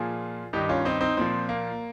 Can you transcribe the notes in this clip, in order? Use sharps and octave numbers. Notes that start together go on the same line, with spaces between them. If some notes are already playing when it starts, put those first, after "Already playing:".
Already playing: A#2 F3 F4 G#4
G2 D#3 D#4 G4
C#4 F4
C4 D#4
C4 D#4
A#2 F3 C4
A#3